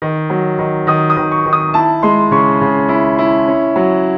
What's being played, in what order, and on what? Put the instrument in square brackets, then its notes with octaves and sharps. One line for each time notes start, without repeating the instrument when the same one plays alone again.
[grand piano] D#3
F#3
D#3
D#3 D#6
D#6
D#3
C#6
D#3
D#6
E4 A5
G#3 C6
C#3 C#6
C#3
E4
E4
C#4
F#3